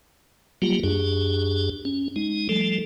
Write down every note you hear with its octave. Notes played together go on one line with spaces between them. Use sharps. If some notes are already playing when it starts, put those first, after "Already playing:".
F#3 G3 A#3 F4 G4
F#2 D4 G4 G#4
C#4
G#3 D#4
F3 G3 A3 A4